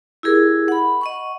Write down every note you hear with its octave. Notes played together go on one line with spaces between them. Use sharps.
E4 G4 G#4 A#4
F#5 B5
D#5 F#5 C#6